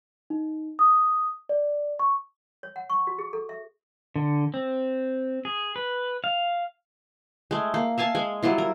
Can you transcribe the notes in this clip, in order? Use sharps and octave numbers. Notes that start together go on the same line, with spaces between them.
D#4
D#6
D5
C#6
C#5
F#5
C#6
F#4
G#4
A4
E5
D3
C4
G#4
B4
F5
G#3 A3
A#3
E5 F5 G#5 A5
G#3 G#5
F#3 G3 E4 F4
A#4